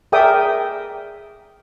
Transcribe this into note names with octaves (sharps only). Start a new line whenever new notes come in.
G#4 A#4 D5 E5 G5 D#6